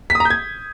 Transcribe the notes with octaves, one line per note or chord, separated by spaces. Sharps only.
B6
D#6
A#5
G6
G#6